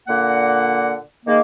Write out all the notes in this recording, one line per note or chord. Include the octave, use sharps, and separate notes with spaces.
A#2 D3 A#3 F#5
D#3 G#3 A#3